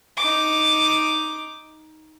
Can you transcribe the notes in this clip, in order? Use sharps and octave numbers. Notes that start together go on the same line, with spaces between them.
D#4 D6